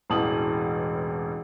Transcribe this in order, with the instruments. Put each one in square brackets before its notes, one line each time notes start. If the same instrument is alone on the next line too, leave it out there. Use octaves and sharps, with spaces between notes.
[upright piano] E1 A1 E3 A5 D#6 F#7